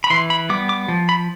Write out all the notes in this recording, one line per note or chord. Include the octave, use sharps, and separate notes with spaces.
B5
E3 C6
B5
G3 B3 D6
D6
F3
B5